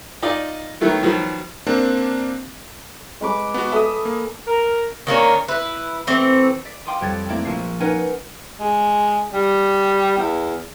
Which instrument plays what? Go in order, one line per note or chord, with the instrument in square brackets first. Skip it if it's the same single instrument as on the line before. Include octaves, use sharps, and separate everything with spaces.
[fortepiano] D#4 F4 D5 D#5
D#3 F#3 A3 B3
B2 D#3 F3 F#3
[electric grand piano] A#3 C4 D4
[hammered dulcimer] G#3 B4 D6
[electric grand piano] B3 F#4
[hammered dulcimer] A4 [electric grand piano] E5 D#6
[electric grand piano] A#3
[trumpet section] A#4
[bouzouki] D#3 A#3 C#4 D4
E4 B4
E3 A3 C4
[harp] D5 B6
F5 G5 B5 C6 D6 D#6
F2 G3 C#5 G5 G#6 A6
A3 A#3 C4 E4 D5
A#1 F3 C#6 C7
C#4 D#4 A#4 B4 F#5
[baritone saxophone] G#3
G3
E2